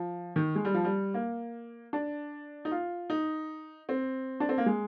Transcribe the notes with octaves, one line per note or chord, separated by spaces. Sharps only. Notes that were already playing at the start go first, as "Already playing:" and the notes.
Already playing: F3
D#3
G#3
G3
F3
G3
A#3
D4
D#4
F4
D#4
C4
D4
C4
A#3
G#3